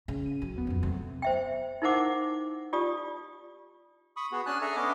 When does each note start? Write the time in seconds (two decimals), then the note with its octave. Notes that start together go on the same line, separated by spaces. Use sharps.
0.08 C#3
0.26 D#7
0.42 F#3
0.55 D#2 B3
0.67 F2 F#3
0.83 C3 F#3 A3 C4
1.22 C5 E5 G5
1.82 D#4 E4 A#4 C5 F#5 D6
2.73 F4 G4 D5 A5 D#6
4.17 B5 C#6 D#6
4.32 B3 F#4 G#4
4.46 C#4 D4 G#5 A5 F#6
4.61 G#4 A4 E5 G#5 A#5
4.76 B3 C#4 D4 D#5 D6